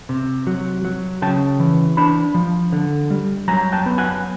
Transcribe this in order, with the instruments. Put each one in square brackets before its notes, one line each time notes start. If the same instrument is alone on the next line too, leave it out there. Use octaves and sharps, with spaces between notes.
[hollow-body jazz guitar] C3
F#3
F#3
C#3 G5 A5
E3
D4 A5 B5
F3
D3
G3
F#3 G#5 A#5
G5 A5
B3
F#5 G#5